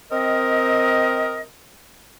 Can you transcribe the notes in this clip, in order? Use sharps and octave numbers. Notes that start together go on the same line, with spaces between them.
C4 A#4 D#5